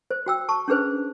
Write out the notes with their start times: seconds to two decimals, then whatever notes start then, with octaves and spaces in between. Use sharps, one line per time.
0.11 C5
0.26 F#4 G5 E6
0.49 A5 C#6
0.68 C#4 D4 G#4 B4 C5